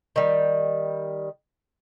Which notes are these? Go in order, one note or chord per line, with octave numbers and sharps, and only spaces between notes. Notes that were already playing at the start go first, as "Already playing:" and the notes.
D#3 G3